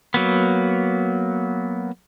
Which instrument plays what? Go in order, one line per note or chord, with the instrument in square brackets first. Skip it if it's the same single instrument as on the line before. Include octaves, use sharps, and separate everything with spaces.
[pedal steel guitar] F#3 A#3 B3